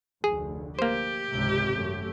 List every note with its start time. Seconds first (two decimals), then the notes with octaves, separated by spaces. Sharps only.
0.24 F1 D2 G#4
0.79 A#3 G4 C5
1.30 G#1 C#2 C3
1.72 F#2 A3